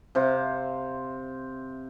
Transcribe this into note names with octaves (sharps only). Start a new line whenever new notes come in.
C3 C5 F5